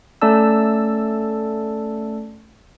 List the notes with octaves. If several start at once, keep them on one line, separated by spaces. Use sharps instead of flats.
A3 C#4 A4 D5 A5 E6